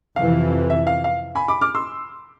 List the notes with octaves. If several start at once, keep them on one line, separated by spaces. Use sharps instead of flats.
F2 C3 E3 F5
E5
F5
F5
G#5 B5
B5 D6
D6 F6
C6 E6